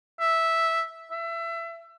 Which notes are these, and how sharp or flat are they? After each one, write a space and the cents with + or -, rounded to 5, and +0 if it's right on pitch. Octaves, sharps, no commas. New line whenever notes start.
E5 -5
E5 +25